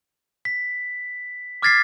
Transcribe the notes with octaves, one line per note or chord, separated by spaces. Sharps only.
B6
D6 F6 G#6 A6 B6 C7